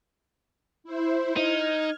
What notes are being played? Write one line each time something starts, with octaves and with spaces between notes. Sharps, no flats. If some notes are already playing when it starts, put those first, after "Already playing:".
E4 C5
D#4 F6 G#6